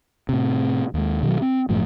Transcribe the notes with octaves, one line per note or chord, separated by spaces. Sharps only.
A2 C3
D#2 G#3
B2 D#3 F3 F#3
C4
G1 F#2 A2 F3